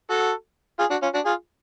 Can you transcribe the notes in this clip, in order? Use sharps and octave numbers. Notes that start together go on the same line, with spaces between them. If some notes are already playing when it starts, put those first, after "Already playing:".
F#4 A4
F4 G#4
D4 F#4
C#4 F4
D4 F#4
F4 G#4